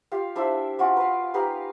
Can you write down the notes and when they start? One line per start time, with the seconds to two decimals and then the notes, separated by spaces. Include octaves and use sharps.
0.12 F4 G4 F5
0.35 D4 E4 C5 E5
0.79 C#4 F4 F#4 D5
0.97 B4 F5
1.34 D#4 G4 B4 F5